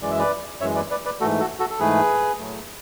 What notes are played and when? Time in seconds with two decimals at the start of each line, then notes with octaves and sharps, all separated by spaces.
0.02 F#2 E3 G#3 D5
0.10 E5
0.19 B4 D5
0.61 F#2 E3 G#3 C#5 E5
0.76 B4 D5
0.90 B4 D5
1.05 B4 D5
1.20 G#2 E3 A3 F#4 A4
1.40 F#4 A4
1.59 F#4 A4
1.70 A4
1.80 G#2 E3 A3 G#4 B4
2.39 A2 F#3 A3